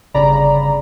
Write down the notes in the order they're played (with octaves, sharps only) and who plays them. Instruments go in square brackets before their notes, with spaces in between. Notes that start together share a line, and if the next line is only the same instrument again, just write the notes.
[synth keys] G1 C#3 D5 A#5 B5